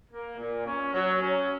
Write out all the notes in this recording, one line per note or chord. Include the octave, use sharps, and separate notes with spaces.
A#3
A#2
C#4
F#3
C#4